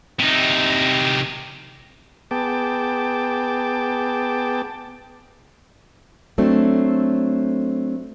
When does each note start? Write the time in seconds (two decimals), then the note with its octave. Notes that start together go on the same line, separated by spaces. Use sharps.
0.19 C3 D#4
2.31 B3 G#4 G5 A5 D6
6.38 F#3 A3 C4 D4